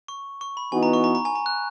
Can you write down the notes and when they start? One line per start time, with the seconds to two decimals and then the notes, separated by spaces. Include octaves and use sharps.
0.08 C#6
0.41 C#6
0.57 B5
0.72 E3 B3 D#4 F#4 G#5
0.83 A#5
0.93 C#6
1.04 A#5
1.15 A#5
1.25 G#5
1.35 A#5
1.46 F#6